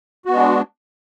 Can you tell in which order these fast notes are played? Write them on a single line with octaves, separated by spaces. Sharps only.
F#4 B3 G#3 D4